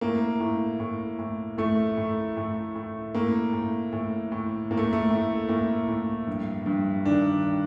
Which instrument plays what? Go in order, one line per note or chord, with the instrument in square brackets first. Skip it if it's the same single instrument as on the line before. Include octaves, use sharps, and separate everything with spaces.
[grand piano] A2 A#3
A2
A2
A2
A2 A3
A2
A2
A2
A2 A#3
A2
A2
A2
A2 A#3
A3
A3
A2
A2 A#3
A2
G2
G2
D#3 D4